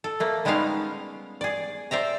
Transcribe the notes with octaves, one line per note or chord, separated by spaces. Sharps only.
A4
A3 A#3
G3 G#3 B3 C#4 D#4 F5
G#4 D5
C5 D5 E5 A#5